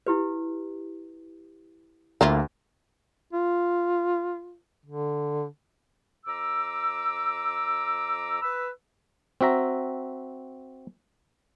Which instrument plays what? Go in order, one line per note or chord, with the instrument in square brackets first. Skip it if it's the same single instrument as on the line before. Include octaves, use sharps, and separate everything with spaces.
[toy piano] E4 G4 B4
[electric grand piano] D2 [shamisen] A#3 E4 F4
[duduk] F4
D3
[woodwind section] F2 A#5 D6 E6
B4 E6
[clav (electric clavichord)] C4 F#4 E5 A#5